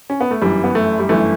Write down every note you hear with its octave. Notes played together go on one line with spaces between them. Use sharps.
C#4
B3
A3
G1 F#2 E3 G3
B3
A3
G3
G1 F#2 E3 A3